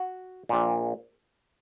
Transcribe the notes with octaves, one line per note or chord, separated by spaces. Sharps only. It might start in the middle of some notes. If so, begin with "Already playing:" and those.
Already playing: F#4
A#1 A#2